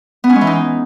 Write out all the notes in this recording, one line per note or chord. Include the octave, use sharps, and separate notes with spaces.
B3
C#4
G#3
E3
D#4